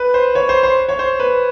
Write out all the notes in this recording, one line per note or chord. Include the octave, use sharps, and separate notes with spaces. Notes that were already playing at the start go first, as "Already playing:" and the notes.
Already playing: B4
C5
C#5
C5
C5
C#5
C5
B4